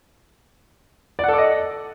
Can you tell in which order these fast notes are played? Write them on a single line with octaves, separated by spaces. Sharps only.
D5 F#5 A4 D6 D#5